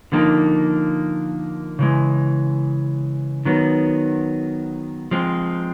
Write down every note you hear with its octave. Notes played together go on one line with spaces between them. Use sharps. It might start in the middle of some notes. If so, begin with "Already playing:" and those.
D3 F3 A#3 D#4
C#3 E3 G#3
D#3 F#3 B3
F3 G#3 C4